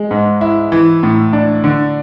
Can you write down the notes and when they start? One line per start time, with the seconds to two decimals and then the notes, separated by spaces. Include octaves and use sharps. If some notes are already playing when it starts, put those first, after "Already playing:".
Already playing: G#3
0.11 G#2
0.41 E4
0.72 E3
1.03 A2
1.33 D4
1.64 D3